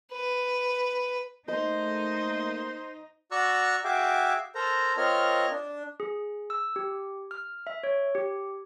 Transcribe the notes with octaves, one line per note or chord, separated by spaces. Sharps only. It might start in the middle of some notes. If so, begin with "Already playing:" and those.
B4
A3 A#3 D#4 C5 D#5
F#4 D5 A#5 C#6 E6 F#6
F#4 G#4 E5 F5 G5 D6
A4 A#4 C5 A#5
C4 F4 A#4 C#5 D#5 F6
D4
G#4
E6
G4
F6
E5
C#5
G4